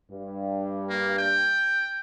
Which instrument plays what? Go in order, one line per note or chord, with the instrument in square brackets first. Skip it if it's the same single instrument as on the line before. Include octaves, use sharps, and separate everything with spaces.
[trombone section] G2
[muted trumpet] A#3
G5